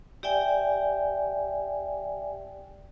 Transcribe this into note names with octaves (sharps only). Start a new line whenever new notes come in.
G4 D5 E5 G5 G#5